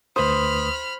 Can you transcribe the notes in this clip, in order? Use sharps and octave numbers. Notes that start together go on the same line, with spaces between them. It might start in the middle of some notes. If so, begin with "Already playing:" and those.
D2 B4 C5 B5 D#6 F6